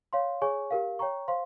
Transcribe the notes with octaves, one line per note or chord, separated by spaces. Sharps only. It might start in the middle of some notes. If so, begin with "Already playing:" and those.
C#5 F5 C6
G#4 C#5 G#5 C#6
G4 A#4 F5
C#5 G5 A#5 C#6
C5 F5 C6